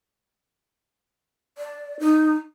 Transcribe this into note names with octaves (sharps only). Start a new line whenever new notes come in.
D5
D#4